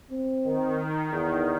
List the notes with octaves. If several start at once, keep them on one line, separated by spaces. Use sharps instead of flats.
C4
D#3
E2